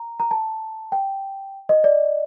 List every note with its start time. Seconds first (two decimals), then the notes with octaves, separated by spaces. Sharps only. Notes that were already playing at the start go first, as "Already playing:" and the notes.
Already playing: A#5
0.20 A#5
0.31 A5
0.92 G5
1.69 D#5
1.84 D5